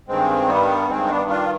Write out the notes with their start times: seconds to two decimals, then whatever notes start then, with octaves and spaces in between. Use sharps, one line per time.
0.08 G2 D#3 G#3 C4
0.49 G3 B3
0.89 G2 D#3 G#3 C4
1.05 D#4
1.10 B3 D4
1.30 D4 F4